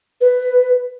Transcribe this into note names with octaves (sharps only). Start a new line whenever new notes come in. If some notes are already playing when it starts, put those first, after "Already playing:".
B4